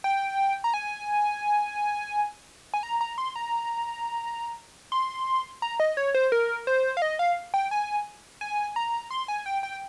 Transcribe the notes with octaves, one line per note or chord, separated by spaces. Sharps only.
G5
A#5
G#5
G#5
A#5
A#5
C6
A#5
C6
A#5
D#5
C#5
C5
A#4
C5
F5
D#5
F5
G5
G#5
G#5
A#5
C6
G#5
G5
G5